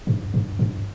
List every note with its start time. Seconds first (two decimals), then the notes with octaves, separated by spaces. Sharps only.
0.07 G2
0.34 G2
0.59 G2